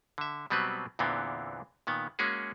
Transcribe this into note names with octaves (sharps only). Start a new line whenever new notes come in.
D3 E5
B2 F#3 G3 B3 C4 B4
E2 A#2 D3 E3 B3 C4
A#2 D#3 B3
G#3 A#3 C#4 F#4 G#4